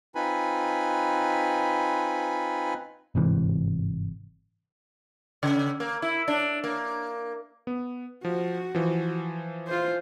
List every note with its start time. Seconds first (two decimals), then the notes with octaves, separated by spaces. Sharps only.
0.15 C4 D#4 F4 B4 G#5 B5
3.15 G1 G#2 C3 E3
5.43 C#3
5.80 A#3
6.02 E4
6.28 D4
6.64 A#3
7.67 B3
8.25 F3 F#4
8.75 E3 F3
9.67 F4 C5